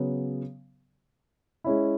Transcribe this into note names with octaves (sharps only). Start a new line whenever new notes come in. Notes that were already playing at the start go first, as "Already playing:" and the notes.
Already playing: C#3 F#3 B3
G#3 C#4 E4